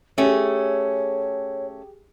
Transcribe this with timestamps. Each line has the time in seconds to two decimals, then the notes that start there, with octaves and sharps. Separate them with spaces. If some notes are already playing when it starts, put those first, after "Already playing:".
0.18 A3 C#4 G4 G#4 C#5